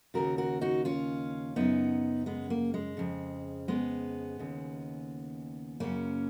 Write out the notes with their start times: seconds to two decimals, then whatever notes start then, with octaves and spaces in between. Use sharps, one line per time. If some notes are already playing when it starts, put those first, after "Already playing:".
0.14 D#2 C#3 F#4 A#4
0.38 F#4 A#4
0.61 D#4 F#4
0.85 C#4 F4
1.56 F#2 C#3 B3 D#4
2.26 G#3 B3
2.50 A#3
2.74 G#3
2.97 F2 C#3
3.68 G#3 B3
4.39 D#2 C#3
5.80 F#2 C#3 A#3 C#4